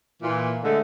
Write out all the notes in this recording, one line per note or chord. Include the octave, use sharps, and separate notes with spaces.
A#2 E3
D3 G#3 A3